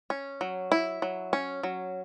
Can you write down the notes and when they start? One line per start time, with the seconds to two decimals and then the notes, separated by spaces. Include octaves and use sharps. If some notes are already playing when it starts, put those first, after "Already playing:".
0.10 C#4
0.41 F#3
0.72 E4
1.02 F#3
1.33 C#4
1.63 F#3